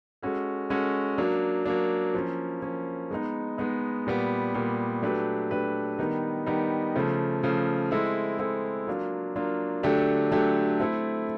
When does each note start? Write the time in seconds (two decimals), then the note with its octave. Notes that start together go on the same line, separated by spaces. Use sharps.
0.23 G#3 C#4 F#4 A4
0.70 G#3 C#4 F#4 A4
1.18 F#3 A#3 D4
1.66 F#3 A#3 D4
2.14 F3 A#3 C#4
2.62 F3 A#3 C#4
3.11 G#3 B3 D#4
3.58 G#3 B3 D#4
4.07 A#2 G3 B3
4.54 A#2 G3 B3
5.02 F#3 A3 D4 G4 B4
5.51 F#3 A3 D4 G4 B4
5.98 D#3 G3 B3 D#4
6.46 D#3 G3 B3 D#4
6.96 C#3 F3 A3
7.43 C#3 F3 A3
7.91 G#3 C4 E4 A4
8.39 G#3 C4 E4 A4
8.87 F#3 A#3 D4 F4
9.35 F#3 A#3 D4 F4
9.83 D3 F#3 A3 D4 G4
10.31 D3 F#3 A3 D4 G4
10.80 A3 C4 E4 A4